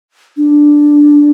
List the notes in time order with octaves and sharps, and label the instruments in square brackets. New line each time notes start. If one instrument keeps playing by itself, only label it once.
[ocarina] D4